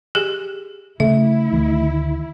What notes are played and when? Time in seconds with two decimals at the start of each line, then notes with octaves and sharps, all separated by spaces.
0.15 G4 G#4
1.00 C#3 A3 E4 E5
1.52 D2 D#3